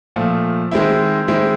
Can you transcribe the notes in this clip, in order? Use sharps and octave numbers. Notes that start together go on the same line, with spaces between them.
A#2 F3 A3
D#3 G#3 C4 E4
D#3 G#3 C4 E4